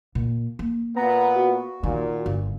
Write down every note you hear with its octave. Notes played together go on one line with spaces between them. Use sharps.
A#2
A#3
A#2 B3 A#5
F#4
A#2 D#3
G1